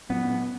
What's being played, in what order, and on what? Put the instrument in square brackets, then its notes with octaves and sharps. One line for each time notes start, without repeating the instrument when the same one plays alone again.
[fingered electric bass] A#2 F#3 C#4 [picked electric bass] B3